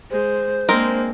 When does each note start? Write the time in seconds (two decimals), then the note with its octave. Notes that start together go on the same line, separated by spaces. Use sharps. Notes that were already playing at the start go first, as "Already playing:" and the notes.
0.11 G#3 C5
0.69 G#3 A#3 C4 D4 A#4